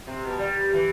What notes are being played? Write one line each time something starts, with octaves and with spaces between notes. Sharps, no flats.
C3
B2
G3
E3